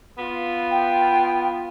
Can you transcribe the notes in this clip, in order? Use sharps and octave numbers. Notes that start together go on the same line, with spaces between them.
B3 F4
G5